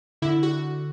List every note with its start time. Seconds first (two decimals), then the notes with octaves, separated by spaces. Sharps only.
0.22 D3 E4
0.43 F#4